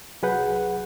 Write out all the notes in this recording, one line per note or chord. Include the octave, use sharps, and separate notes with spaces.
C2 F#3 G#4 B4 F#5 G6